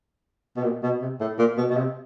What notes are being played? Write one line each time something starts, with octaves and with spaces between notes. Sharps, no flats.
B2
A#2
B2
C3
A2
A#2
B2
B2
C3